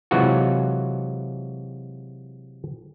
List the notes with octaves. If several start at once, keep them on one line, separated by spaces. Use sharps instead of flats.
C3 E3 F#3 G#3 F4 F#4